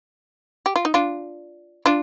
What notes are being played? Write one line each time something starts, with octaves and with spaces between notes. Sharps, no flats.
G4
F4
D#4
D4 F4
D4 F4